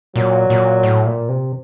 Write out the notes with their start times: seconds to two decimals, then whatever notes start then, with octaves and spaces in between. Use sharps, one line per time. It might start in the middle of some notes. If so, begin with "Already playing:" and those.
0.16 A#2 F#3
0.50 A#2
0.83 A2
1.06 A#2
1.29 C3